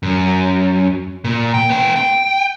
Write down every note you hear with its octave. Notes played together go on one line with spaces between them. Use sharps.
F#2
A#2
G5
B3 G5
G5